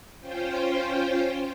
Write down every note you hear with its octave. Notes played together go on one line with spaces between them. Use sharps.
C#4 F4 C5 G5